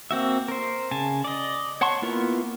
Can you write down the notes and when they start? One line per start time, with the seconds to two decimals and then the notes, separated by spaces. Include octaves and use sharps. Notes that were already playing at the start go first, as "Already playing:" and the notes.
0.11 A#3 C4 F#4 E5
0.48 A#4 C5
0.91 C#3 G#5 A5
1.24 D5 D#5
1.81 C#5 F#5 A5 C6 C#6
2.02 A#3 B3 E4 F4 A#4